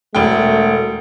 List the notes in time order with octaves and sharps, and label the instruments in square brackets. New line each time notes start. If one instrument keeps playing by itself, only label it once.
[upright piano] E1 G5 [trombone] A3